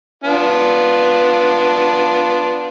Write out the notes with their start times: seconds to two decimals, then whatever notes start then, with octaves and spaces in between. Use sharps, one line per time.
0.24 B3 D4 F4